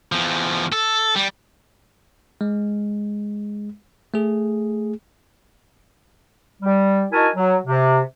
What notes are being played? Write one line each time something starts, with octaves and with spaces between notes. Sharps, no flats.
E2 F3
A4
G3
G#3
A3 G#4
G3
D#4 E4 F#4 A#4 G#5 A5
F#3
C3